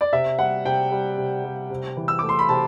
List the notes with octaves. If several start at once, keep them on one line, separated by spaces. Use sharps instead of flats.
D5
C3 E5
G3 F#5
C3 G5
G3
C3
G3
C3
E3
E6
A3 D6
C6
B5
C3 A5